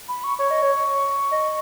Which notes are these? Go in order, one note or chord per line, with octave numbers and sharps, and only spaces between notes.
B5
C#6
C#5 C#6
D#5
C#5
D#5